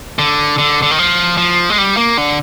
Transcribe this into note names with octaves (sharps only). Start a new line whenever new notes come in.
D3
D3
D3
D#3
F3
F3
G#3
G3
A#3
D3